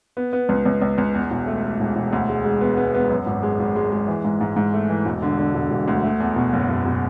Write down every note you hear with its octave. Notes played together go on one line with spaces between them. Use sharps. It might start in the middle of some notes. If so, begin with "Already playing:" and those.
B3
B3
C#2
C#2
C#2
C#2
E2
E1
A3
A3
E1
E1
D2
G#3
G#3
B3
B3
B3
F#2
G#1
G#3
G#1
G#3
G#3
E3
G#2
G#2
G#2
A3
E3
E1
D3
D3
E1
E1
D2
A3
E2
B2
F#1
F#1
B2